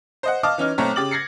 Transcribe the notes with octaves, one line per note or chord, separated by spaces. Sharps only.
C5 D#5 F#5
D#5 F5 A5 D6 F6
E3 C#4 D#4 F6
B1 A3 C4 C#5 A#5
C#3 G4 D6 A6 F#7
G#6 A#6 C7 C#7